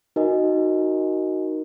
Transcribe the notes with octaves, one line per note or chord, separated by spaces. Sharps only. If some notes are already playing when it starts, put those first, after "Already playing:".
D#4 F#4 A#4 D#5 G#5